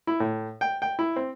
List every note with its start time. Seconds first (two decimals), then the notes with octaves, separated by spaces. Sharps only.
0.07 E4
0.20 A2
0.61 G5
0.82 G5
0.99 E4
1.16 C4